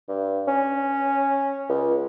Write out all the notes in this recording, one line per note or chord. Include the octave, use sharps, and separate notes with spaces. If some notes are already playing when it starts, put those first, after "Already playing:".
G2
C#4
C#2